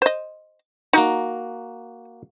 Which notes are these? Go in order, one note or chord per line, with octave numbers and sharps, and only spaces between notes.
C5 D#5
A#3 D#4 F#4 A#5